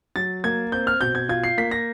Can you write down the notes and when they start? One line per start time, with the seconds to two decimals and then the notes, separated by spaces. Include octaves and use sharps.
0.16 F#3 A6
0.44 A#3 G#6
0.72 C4 G6
0.87 F6
1.01 B2 G6
1.15 G#6
1.29 F4 G#6
1.44 C7
1.57 A#3 B6
1.71 A#6